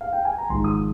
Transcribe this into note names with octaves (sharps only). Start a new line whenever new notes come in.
F5
G5
G#5
A#5
G#1 G#2 F3 G#3 C6
D#6